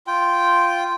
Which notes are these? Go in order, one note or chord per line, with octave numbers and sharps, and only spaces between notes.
F4 G5